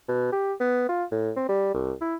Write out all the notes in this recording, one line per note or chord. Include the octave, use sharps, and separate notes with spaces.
B2
G4
B3
F4
A2
C4
G3
C2
E4